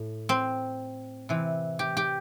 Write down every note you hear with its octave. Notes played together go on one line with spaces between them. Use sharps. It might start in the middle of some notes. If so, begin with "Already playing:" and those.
Already playing: A2
C4
C3 E3
G4
G4